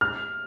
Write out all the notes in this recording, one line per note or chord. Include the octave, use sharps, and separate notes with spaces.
F6